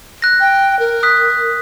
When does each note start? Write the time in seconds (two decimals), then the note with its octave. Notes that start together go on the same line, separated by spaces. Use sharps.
0.22 F#6 A#6
0.40 G5
0.79 A#4
1.03 D#6 F#6 B6